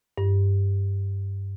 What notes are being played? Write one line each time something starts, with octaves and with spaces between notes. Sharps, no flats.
G2